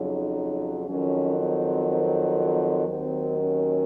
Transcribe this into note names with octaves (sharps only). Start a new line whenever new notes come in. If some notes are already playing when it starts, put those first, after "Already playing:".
Already playing: F2 C#3 F#3 D#4
F2 D#3 F#3 C#4
C4
C4
C4
D#2 D#3 F#3 C4
C#4